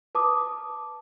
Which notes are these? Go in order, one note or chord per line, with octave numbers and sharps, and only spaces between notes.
B4 A5 D6 D#6